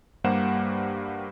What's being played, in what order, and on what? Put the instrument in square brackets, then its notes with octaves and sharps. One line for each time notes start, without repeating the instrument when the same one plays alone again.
[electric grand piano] G2 G3 A#3 C5 F#5 E7